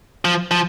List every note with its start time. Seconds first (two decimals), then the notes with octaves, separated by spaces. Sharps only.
0.25 F3
0.51 F3